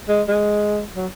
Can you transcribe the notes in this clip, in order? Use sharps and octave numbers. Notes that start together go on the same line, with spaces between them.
G#3
G#3
F#3